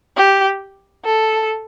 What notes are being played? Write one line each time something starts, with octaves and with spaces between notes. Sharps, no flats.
G4
A4